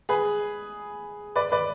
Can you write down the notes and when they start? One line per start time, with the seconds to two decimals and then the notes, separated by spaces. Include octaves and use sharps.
0.09 G#4 B4
1.36 B4 D5
1.52 B4 D5